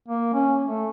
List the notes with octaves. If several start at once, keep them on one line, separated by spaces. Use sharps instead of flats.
A#3
C#4
A3